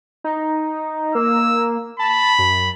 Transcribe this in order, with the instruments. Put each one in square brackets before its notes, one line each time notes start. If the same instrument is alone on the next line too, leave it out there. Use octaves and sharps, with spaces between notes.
[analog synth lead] D#4
[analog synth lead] A#3 [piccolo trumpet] E6
[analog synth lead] A5 [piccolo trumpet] B5
[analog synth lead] F#2